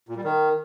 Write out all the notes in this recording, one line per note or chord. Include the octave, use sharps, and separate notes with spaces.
A#2
G3
D#3